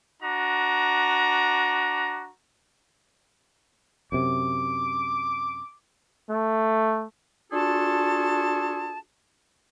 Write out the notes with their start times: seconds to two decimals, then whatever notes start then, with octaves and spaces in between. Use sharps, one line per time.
0.22 D4 F#4 A#5
4.12 F#2 C3 D6
6.30 A3
7.53 D4 F4 F#4 G#4 A4 A5